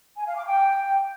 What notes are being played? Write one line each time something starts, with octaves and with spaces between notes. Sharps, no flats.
G#5
F5
D6
G5